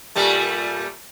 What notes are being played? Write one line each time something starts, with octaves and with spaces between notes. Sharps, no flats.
A#2 G3 A3